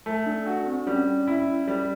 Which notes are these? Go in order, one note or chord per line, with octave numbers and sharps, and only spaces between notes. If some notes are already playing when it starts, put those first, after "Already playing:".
A3
D4
D4 F#4
C4
G3 C#4
E4
G3